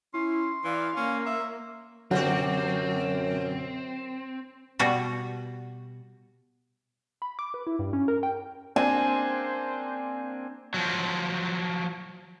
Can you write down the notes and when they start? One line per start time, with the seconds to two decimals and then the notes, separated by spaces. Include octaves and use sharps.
0.14 C#4 E4 C6
0.64 E3 D5 F5
0.96 A#3 C#4
1.26 E5
2.11 F#2 B2 D3 F#3 C4 F#4 F#5
4.79 B2 G3 F#4
7.22 B5
7.39 D6
7.54 B4
7.67 E4
7.79 G2
7.93 C#4
8.08 A#4
8.23 G5
8.76 A#3 C4 D4 C5 G#5
10.74 F3 F#3